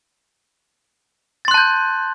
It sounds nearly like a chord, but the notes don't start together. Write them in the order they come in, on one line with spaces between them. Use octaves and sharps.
A6 C6 F#6 A5 G6